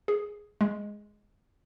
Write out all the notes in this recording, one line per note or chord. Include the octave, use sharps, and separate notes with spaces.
G#4
G#3